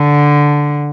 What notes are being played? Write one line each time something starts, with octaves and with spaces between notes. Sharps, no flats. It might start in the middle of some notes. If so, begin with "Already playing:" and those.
Already playing: D3